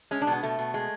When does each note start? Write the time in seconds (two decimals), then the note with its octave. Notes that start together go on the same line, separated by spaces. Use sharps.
0.11 G#3 C#4
0.22 D4
0.27 B2 B3
0.43 B2 A3
0.59 B2
0.74 G#3